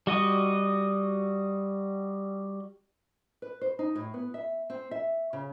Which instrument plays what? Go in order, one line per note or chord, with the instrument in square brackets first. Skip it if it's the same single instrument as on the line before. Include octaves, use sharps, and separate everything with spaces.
[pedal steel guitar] G3 F#4 D#5
[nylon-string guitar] B4
C5
D#4
A2
B3
E5
C4
E5
C#3